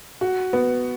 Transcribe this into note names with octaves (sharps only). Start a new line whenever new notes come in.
F#4
B3